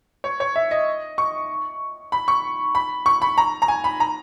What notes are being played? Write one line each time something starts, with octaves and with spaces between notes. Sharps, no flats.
C#5
C#5
E5
D#5
C#6
B5
C#6
B5
C#6
B5
A#5
A#5
G#5
B5
A#5